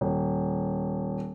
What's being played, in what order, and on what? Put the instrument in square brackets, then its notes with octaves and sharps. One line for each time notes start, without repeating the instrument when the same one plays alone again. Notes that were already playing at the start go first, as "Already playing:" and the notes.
[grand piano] D#1